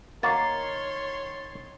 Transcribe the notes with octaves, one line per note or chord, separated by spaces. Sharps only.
D#3 A#3 F#4 C#5 C6 A6 C7